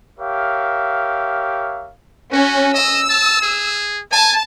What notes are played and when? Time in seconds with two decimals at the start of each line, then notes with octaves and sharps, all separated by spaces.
0.19 G4 A#4 C#5 E5 F5
2.32 C#4 F#4
2.74 D#5 E6
3.09 A5
3.42 G#4
4.12 G#5 A5